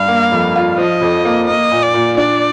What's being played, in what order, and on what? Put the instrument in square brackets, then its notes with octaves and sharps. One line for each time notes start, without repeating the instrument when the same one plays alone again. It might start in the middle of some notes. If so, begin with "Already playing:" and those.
Already playing: [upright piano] G2 [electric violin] F5
[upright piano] A#3
F2
F4
[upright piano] F3 [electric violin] D#5
[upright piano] F2
A#3
[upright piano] A#3 [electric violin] D#5
[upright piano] A#2
[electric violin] D5
[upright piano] A#2
[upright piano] D4 [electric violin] D5